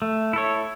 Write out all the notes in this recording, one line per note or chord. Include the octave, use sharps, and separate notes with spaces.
A3
E4 A4 C#5